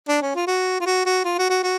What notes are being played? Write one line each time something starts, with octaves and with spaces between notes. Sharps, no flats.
D4
C#4
F4
F#4
F4
F#4
F#4
F4
F#4
F#4
F#4